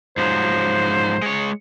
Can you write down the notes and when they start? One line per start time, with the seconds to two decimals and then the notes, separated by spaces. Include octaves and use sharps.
0.17 G#2 F3 F#3 C5
1.22 G#3 C#5